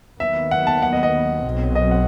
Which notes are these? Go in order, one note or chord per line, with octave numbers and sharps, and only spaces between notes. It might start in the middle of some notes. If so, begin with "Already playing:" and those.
D#2 D#3 F#3 B3 E5
F#5
A5
F#5
D#5
D#5
B1 B2 F#3 C4
D#5
F#5